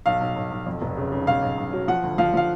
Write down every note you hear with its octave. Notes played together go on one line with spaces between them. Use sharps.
B1 F5
B1
B1
B1
F2
F1
C#3
C#3
B1 F5
B1
B1
F#3
F3 F#5
D2
F3 F5
F3 F5